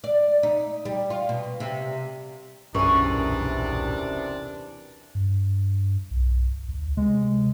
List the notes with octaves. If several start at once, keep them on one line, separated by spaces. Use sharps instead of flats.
D5
D#4
G3
F4
B2
C3
D#1 B1 F#2 C3 E3 D4 G#4 C#5
G2
B1
D2
C3 G#3